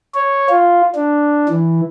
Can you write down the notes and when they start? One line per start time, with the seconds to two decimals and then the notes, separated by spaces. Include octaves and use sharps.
0.15 C#5
0.50 F4
0.95 D4
1.49 E3